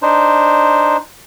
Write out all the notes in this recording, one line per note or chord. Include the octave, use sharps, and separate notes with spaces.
D4 D#4 C5